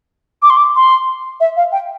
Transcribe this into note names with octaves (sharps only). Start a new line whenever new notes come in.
D6
C6
D6
C6
E5
F5
G5